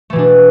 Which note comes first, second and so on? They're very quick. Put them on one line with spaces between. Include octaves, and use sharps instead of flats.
A3 E3 B2 D4